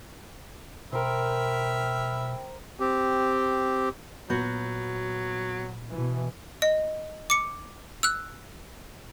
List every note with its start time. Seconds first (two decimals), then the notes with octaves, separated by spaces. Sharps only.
0.93 B2 A#4 C5 E5 G5 B5 F6
2.80 C4 G4
4.30 A#2 F#3 B3 F#4 B5 G6
5.92 B2 E3
6.62 D#5
7.30 D6 C#7
8.03 E6 F#6